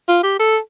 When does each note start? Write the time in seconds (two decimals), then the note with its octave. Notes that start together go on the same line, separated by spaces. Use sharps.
0.08 F4
0.23 G4
0.39 A4